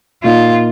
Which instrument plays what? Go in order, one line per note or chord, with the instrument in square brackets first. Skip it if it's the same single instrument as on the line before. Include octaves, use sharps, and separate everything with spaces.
[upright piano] A#2 A#3 D#4 [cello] F4